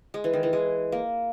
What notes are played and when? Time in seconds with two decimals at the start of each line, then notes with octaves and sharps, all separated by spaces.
0.14 G#3
0.24 E3
0.33 D#3
0.43 E3
0.53 G#3
0.92 A#3